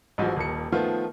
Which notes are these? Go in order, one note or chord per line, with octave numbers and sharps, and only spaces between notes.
A1 G#2 F3 F#3 G#3
D#1 D#2 C#7
D#3 F3 A3 B3 F4